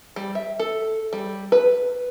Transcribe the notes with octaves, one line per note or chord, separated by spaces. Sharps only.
G3
E5
A4
G3
B4